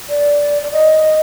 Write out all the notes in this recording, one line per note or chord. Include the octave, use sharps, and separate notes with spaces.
D5
D5
D#5